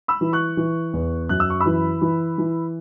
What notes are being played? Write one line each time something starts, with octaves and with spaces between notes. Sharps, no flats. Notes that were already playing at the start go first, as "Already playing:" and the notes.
B5 E6
E3
C#6 F#6
E3
E2
F#2 F#6
E6
C#6
B5 E6
E3
E3
E3